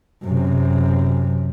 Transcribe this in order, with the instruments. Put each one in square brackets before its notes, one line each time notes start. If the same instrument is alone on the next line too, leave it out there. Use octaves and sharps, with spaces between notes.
[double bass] F#2 C3